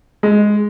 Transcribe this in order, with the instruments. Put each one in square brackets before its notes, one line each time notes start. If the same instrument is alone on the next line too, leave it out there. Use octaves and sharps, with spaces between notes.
[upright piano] G#3